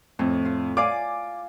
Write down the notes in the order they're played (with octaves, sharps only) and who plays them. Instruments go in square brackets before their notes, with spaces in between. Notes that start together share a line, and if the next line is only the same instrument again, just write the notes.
[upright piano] F2 [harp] A2
[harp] F4
[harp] D5 F5 G#5 [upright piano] D6